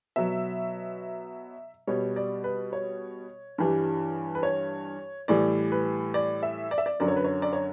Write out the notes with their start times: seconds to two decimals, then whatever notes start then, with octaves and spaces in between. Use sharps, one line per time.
0.16 B2 F#3 E5
1.87 B2 G3 C#5
2.16 D5
2.44 B4
2.73 C#5
3.58 G2 E3 G3
4.35 B4
4.43 C#5
5.28 A2 E3 G3 D5
5.72 B4
6.14 D5
6.43 E5
6.71 D5
6.78 E5
6.86 D5
7.00 F#2 D3 F#3 D5
7.08 C#5
7.17 B4
7.24 C#5
7.42 D5
7.53 C#5